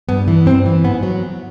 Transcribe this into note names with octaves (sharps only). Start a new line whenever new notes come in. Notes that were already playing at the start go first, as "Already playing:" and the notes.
G2 B3
E3
G2 C4
E3
G#2 B3
F#3